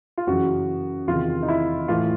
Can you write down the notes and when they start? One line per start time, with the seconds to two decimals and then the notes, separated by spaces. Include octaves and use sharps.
0.18 F4
0.27 F#2 C#3 E3 F#4
1.07 E2 C3 D#3 F4
1.43 D#4
1.48 E4
1.88 A2 E3 F4